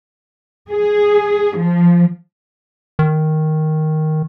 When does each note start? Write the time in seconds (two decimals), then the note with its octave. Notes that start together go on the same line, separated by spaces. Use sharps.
0.70 G#4
1.57 F3
2.99 D#3